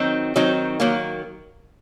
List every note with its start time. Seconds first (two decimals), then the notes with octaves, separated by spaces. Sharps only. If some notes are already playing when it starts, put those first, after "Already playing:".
Already playing: D#3 F#3 C4 D#4
0.36 D#3 F#3 C4 D#4
0.80 D#3 F#3 A#3